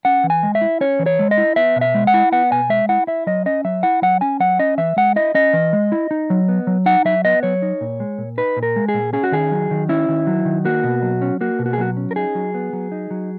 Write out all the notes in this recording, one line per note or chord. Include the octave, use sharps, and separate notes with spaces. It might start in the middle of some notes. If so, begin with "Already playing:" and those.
C#4 F#5
E3
G#5
G#3
E5
E4
C#4 C#5
E3
C#5
G#3
D#5
E4
B3 E5
B2
E5
G#3
F#5
E4
B3 F#5
B2 G#5
G#3 E5
E4 F#5
E4 E5
F#3 D#5
C#4 D#5
F#3 E5
E4 F#5
F#3 F#5
C#4 G#5
F#3 F#5
C#4 D#5
E3 E5
G#3 F#5
E4 D#5
C#4 D#5
E3
G#3
E4
D#4
F#3
B3
F#3
D#4 F#5
F#3 E5
B3 D#5
F#3 C#5
D#4
A#2
G#3
A#2
D#4 B4
A#2
A#4
G#3
G#4
A#2
C#4 G#4
F#4
D#3 G#4
F#3
D#3
C#4 E4
D#3
F#3
D#3
A#3 F#4
B2
F#3
C#4
A#3 F#4
B2
F#4
G#4
F#3 F#4
C#4
A#4
D#4 G#4
F#3
B3
F#3
D#4
F#3